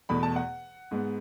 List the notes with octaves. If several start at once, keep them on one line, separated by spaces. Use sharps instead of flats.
E2 B2 A3 B5
A5
F#5
G#2 G#3 B3